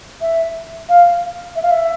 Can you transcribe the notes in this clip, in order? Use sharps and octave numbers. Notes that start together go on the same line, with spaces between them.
E5
F5
E5
F5
E5